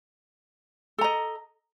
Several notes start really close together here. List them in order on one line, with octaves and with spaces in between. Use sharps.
A4 A#5 D#5